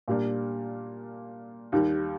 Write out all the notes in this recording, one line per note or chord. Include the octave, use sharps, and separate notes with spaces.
A#2 G3 A#3 D4
D#2 D#3 G3